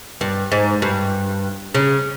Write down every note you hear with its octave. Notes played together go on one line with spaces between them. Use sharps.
G2
G#2
G2
C#3